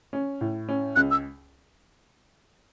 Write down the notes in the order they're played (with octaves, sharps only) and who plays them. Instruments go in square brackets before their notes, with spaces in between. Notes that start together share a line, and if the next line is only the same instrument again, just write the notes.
[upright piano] C#4
A2
C#4
[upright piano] C#2 [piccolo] F#6
[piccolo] E6